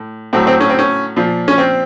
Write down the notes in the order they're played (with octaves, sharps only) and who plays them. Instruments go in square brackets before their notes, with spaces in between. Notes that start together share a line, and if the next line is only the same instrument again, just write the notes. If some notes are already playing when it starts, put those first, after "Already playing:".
Already playing: [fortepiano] A2
A2 F#3 C4
C4
C#4
C4
C#4
A#2 F3
C#4
C4